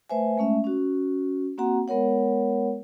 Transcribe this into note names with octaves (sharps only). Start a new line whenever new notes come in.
A3 B4 C5 E5 G#5
G#3 A3 C#4 E5
C#4 F#4
A#3 C4 F#4 F#5 A#5
G#3 B3 A#4 C#5 F#5